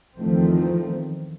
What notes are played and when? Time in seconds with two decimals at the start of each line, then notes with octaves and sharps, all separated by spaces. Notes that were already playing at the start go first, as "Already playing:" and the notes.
0.18 E2 D#3 F3 A3 C4